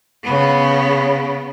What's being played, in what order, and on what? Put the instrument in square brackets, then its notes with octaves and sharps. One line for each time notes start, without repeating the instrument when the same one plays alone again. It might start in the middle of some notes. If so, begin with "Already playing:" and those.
[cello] C#3 B3